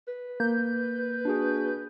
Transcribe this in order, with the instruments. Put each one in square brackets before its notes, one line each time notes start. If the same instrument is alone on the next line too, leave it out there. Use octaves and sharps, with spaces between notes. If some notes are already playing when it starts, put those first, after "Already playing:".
[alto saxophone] B4
[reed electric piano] A#3 [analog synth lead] G6
[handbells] D4 F#4 G#4